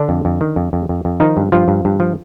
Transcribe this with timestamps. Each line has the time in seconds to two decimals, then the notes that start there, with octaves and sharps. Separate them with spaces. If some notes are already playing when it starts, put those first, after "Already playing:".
Already playing: D3 D4
0.09 F2
0.25 F2
0.41 D#3
0.56 F2
0.73 F2
0.89 F2
1.05 F2
1.20 D#3 F3 D#4
1.37 G2
1.52 G2 F3 F4
1.68 G2
1.85 G2
2.00 F3